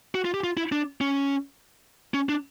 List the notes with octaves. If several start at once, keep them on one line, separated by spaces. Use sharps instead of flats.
F#4
F4
G4
F4
E4
D4
C#4
C#4
D4